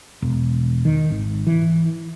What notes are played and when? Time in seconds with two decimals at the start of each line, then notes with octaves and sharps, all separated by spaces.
0.22 E1
0.85 D#3
1.10 G#1
1.47 E3